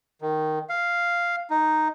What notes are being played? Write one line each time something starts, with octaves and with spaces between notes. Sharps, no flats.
D#3
F5
D#4